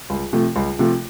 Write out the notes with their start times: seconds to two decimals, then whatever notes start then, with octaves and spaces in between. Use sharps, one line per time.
0.10 C#2
0.33 C3 F3 A3
0.56 C#2
0.79 C3 F3 A3